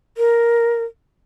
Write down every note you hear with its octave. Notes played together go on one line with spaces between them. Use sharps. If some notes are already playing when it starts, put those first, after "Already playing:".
A#4